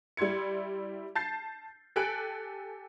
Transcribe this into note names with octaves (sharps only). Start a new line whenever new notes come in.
G3 E4 C6 G#6 C#7
A5 G6 A6 C7
G4 A4 G#5 F#6 D7